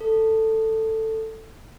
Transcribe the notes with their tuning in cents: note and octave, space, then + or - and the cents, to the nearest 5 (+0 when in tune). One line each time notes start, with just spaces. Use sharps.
A4 +10